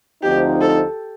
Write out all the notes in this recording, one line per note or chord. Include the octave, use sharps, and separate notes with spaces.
D2 D3 F3 C4 D#4 G4
A4